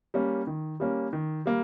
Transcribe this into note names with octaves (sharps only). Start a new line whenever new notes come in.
G3 A#3 C#4
D#3
G3 A#3 C#4
D#3
G3 A#3